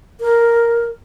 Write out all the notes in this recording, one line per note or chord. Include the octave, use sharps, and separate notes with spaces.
A#4